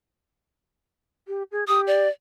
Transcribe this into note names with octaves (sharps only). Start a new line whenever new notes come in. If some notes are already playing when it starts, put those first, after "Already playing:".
G4
G#4
G4 D#6
D5